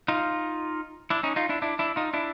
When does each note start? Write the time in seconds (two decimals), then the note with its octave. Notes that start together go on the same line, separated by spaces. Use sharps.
0.08 D#4 F4
1.10 D4 E4
1.23 C#4 D#4
1.36 D#4 F4
1.49 D4 E4
1.62 D4 E4
1.79 D4 E4
1.96 D#4 F4
2.13 D4 E4